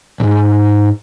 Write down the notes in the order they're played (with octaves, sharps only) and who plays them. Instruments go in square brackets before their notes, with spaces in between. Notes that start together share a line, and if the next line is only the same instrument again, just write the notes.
[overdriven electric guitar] B1 G#2